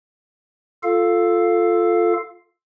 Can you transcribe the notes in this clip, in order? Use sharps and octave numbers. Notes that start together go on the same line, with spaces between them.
F4 A4 F5